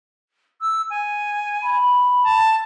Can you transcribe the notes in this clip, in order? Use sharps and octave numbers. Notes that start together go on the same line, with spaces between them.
E6
G#5
B5
A5